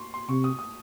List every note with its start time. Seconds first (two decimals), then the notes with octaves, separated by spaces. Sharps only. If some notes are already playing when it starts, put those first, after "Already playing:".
Already playing: C6 C#6
0.14 C6
0.29 C3 C#6
0.44 D#6
0.59 D#6